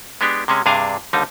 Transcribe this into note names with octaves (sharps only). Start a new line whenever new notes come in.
G#3 B3 D4 G4
C3 G#3 C#4
G2 C3 D4 G#4 F5
D#2 D3 G3 D#4